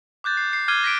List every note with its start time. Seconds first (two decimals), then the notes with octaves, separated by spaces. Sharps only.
0.24 D6 F#6 G6 A6
0.37 C7
0.53 C7
0.68 D6 F6 G#6 C7 D#7 G7
0.84 A#6 B6 D7